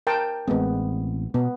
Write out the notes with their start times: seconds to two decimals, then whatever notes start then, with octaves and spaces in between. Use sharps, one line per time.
0.07 A#4 G5 A5
0.48 A1 G#3 B3 C4
1.34 B2 B3